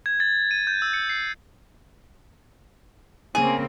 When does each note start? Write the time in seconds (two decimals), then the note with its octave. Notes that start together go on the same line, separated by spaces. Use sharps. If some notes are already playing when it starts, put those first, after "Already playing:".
0.06 G#6
0.20 A6
0.51 D#7
0.67 G6
0.82 E6
0.94 C#7
1.09 C7
3.35 C#3 A#3 C4 G#4